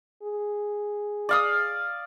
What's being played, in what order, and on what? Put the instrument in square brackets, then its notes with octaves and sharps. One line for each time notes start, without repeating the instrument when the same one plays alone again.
[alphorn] G#4
[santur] D5 F5 D#6